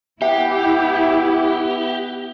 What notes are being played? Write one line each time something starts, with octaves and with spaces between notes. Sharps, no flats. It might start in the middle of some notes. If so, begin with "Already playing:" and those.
B3 E4 G4 E5